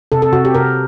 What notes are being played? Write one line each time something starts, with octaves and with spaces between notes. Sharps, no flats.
C3 A4
A4
C3 F#4
G4
C3 A#4